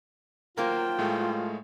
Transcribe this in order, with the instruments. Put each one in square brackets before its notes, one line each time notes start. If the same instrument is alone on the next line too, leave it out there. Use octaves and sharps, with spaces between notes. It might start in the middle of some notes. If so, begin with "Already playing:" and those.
[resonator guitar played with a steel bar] F#3 A#3 C5 [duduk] F4 [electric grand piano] A#4 [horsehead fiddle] G5
[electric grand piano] A2 G#3 A3